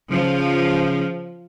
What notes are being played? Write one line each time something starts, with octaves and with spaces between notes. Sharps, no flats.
C#3 F3